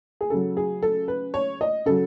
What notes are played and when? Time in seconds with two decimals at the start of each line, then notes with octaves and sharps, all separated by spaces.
0.21 G#4
0.30 C#3 F#3 A4
0.57 G#4
0.83 A4
1.08 B4
1.34 C#5
1.61 D#5
1.86 C#3 F#3 A4